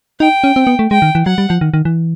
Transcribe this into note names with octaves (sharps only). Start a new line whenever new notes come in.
D#4 G5
C#4
C4
B3
A3
G#3 G5
D#3
E3
F#3 F#5
G3
F3
D#3
D#3
E3